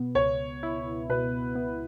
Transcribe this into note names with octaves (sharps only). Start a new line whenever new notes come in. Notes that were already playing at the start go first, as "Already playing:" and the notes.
Already playing: B2 B3
C#2 C#5
E4
B2 B4
B3